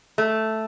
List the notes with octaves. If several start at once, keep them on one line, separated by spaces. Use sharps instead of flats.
A3